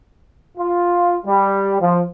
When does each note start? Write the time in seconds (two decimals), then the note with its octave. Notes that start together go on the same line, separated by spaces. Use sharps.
0.58 F4
1.26 G3
1.81 F3